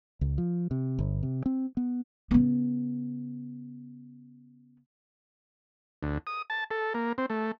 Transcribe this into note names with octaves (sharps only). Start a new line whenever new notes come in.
C#2
F3
C3
G1
C3
C4
B3
C#3 B3
D2
D#6
A5
A4
A#3
C4
A3